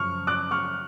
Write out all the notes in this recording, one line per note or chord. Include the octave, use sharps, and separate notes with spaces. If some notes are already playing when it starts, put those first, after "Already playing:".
Already playing: F#2 C#3 F3 C#6 F6
D6 F#6
C#6 F6